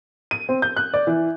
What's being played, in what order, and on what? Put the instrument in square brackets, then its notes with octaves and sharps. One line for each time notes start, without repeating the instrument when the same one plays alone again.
[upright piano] D#7
C4
G6
F#6
D5
E3